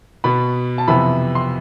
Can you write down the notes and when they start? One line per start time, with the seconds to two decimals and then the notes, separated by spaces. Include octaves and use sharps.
0.24 B2 B3 B5
0.78 A5
0.88 F2 C3 E3 B3 B5
1.35 C6